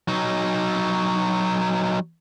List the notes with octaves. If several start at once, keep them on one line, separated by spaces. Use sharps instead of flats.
F#3 D#4